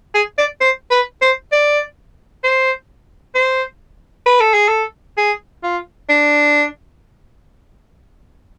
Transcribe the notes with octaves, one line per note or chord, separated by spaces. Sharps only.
G#4
D5
C5
B4
C5
D5
C5
C5
B4
A4
G#4
A4
G#4
F4
D4